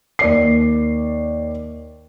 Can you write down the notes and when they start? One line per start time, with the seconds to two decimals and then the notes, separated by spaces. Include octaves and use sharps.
0.19 D#2 D5 C7